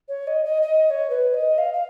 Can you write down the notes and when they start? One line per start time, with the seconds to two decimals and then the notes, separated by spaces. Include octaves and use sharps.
0.08 C#5
0.27 D#5
0.45 D#5
0.62 D#5
0.87 D#5
0.90 C#5
1.10 B4
1.34 D#5
1.58 F5
1.73 F5